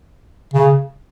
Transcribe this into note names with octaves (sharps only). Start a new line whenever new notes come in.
C#3